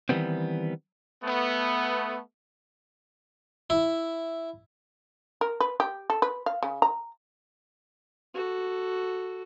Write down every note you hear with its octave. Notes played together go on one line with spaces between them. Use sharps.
D#3 E3 G3 B3 C4
A3 B3
E4
A#4
B4
G4
A4
B4
F5
C#3
A#5
F#4 A4